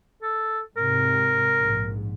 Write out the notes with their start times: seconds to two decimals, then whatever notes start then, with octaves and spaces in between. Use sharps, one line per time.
0.22 A4
0.77 G#2 C3 A#4
1.60 A#1 G#2